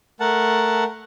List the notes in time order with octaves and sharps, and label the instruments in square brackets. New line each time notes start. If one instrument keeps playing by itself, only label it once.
[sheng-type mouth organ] A3 A#4 F#5 A5